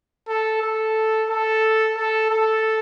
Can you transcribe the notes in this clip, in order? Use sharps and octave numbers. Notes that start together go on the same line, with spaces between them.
A4
A4
A4
A4
A4